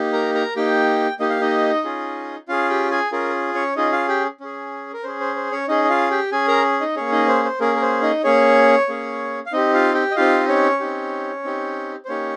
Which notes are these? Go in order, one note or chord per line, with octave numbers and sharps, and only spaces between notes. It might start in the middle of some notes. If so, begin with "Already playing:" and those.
Already playing: A#3 D#4 G4
A#4 A#5
A#4 A#5
A#3 D#4 G4 G5
A#3 D#4 G4 D#5
F5
D#4 D#5
C#4 F4 G#4
C#4 F4 G#4 F5
G4 G5
G#4 G#5
C#4 F4 G#4 A#4
C#4 C#5
C#4 D#4 F4 G#4 D#5
F4 F5
G4 G5
C#4 G#4
A#4
C#4 G#4 C5
C5
C5
C#4 C#5
C#4 D#4 G#4 D#5
D#5
F4 F5
G4 G5
C#4 G#4 G#5
A#4 A#5
D#4 D#5
A#3 C#4 G#4 C#5
D#4 D#5
C5
C5
A#3 C#4 G#4 A#4
A#4
C5
D#4 D#5
A#3 C#4 G#4 C#5
A#3 C#4 G#4
F5
C4 D#4 G4 D#5
F4 F5
G4 G5
D#5
C4 D#4 F4 G4 F5
D#5
C#4 C#5
C4 D#4 G4
C4 D#4 G4
C5
A#3 C#4 D#4 G4 C#5